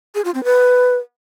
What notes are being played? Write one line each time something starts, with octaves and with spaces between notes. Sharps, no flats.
G#4
F4
C4
B4